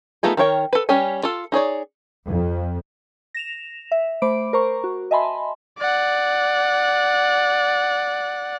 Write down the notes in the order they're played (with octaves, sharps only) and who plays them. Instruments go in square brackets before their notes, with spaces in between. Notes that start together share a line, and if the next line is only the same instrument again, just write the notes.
[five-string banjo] A3 B3 D#4 F4 G#4
D#3 A#4 C#5 G5
A4 B4
G3 C#4 G4 C#5 G#5
F4 A4
D#4 G#4 C#5 D5
[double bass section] F2
[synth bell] A#6 E7 F7
E5
A3 C5 B5 D6 D7
A#4 C5 A#5 C#6
F#4
D#5 E5 G#5 A5 B5 C6
[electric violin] D5 F#5